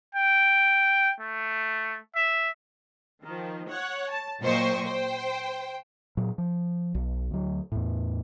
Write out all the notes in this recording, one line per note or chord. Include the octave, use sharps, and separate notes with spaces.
G5
A3
E5
D#3 F3
C#5 F#5
A5
A#2 F#3 C5 D#5 G5 C#6
C5 G5
A#2 F#3
F3
B1
D2 F#3
E2 A2